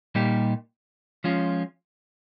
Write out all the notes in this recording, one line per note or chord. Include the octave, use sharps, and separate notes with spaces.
A#2 G3 A#3 D#4 G4
F3 G#3 C#4 F4